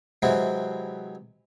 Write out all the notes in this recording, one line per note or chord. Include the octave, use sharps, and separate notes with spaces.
C3 E3 F#3 G#3 C4 E4